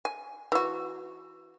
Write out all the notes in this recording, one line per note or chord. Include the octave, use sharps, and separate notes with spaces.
G#5
E3 F#4